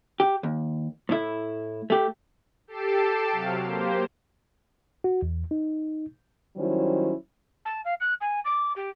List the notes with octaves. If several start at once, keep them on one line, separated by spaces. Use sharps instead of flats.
G4
D#2
A2 E4
A3 G4
G4 A4 A5 C7 D7 E7
C3 F#3 F5
A#3 G4 C5
F#4
E2
D#4
D#3 F#3 G3 C#4 E4 C5
A5
F5
F#6
G#5
D6
G4